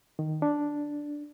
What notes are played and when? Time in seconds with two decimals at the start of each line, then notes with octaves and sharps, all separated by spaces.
0.19 D#3
0.42 D4